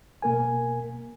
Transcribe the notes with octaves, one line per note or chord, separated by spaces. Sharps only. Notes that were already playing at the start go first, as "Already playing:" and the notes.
B2 A#3 A#4 G#5